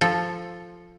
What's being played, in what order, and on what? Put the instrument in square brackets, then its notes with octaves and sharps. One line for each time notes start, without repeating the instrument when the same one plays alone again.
[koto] F3 A4